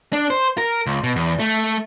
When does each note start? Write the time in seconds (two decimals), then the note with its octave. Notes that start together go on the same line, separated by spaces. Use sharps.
0.13 D4
0.30 C5
0.58 A#4
0.86 C#2
1.04 B2
1.16 E2
1.39 A3